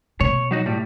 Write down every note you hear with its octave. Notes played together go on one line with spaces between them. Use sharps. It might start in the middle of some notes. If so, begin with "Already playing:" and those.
B2 C#5
F#3 D#4 F#4
A2 G3